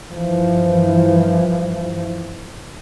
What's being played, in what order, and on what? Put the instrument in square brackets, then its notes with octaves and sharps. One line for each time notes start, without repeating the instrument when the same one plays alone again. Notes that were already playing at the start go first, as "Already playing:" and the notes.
[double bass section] G2 E3 F3